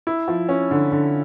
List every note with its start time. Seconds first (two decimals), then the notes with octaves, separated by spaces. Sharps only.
0.07 E4
0.28 F3
0.49 C#4
0.71 D3
0.92 D3